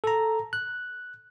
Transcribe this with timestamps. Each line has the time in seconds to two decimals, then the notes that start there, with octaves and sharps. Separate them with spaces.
0.04 A4 A#5
0.53 F#6